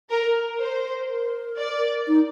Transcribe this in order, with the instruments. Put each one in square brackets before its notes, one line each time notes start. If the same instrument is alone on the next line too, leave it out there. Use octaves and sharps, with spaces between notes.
[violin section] A#4
C5
[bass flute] A#4
[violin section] D5
[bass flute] D#4